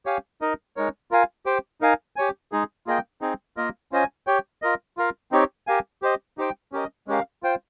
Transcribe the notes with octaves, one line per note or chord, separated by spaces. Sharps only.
G4 C#5 F5 G#5
D#4 A#4 D#5
G#3 D#4 A#4 C#5
F4 A#4 F5 G#5
G4 C5 G5
D#4 A#4 F5 G#5
G4 C#5 G#5
G#3 D#4 G#4
A#3 F4 G#4 D#5 G5
C4 D#4 G#4
A#3 F4 A#4 D#5
C#4 F4 C5 D#5 G#5
G4 C#5 G5
F4 A#4 D#5
F4 A#4 F5
C4 D#4 G4 C#5
G4 A#4 F5 G#5
G4 C5 D#5
D#4 G4 C5 G5
C#4 G4 A#4 D#5
G#3 C#4 G4 A#4 F5
F4 C5 G5